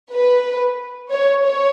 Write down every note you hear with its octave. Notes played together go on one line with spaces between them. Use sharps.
B4
C#5
C#5